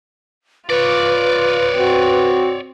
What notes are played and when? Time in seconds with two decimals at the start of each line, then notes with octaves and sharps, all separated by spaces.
0.70 F4 B4 C#5 D5
1.77 C4 F#4